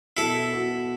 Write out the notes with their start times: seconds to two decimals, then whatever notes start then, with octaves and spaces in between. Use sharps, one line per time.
0.17 B2 E4 A4
0.52 B3 F#4